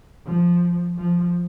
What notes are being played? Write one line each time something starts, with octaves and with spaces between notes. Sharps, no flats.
F3
F3